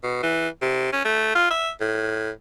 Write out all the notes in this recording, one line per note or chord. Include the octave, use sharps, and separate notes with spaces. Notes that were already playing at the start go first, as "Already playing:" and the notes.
B2
E3
C3
C#4
A3
F4
E5
A2